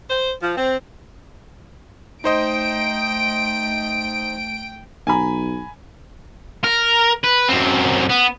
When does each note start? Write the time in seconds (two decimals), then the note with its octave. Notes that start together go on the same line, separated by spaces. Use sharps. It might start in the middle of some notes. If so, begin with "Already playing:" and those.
0.10 C5
0.42 F3
0.57 C4
2.24 A3 D#4 C5 D#5 G5 D7
5.07 B1 G#5 A#5 B5
6.64 A#4
7.24 B4
7.49 F#2 C4
8.10 B3